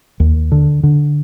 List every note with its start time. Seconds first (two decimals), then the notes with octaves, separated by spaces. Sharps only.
0.20 D#2
0.52 D3
0.83 D3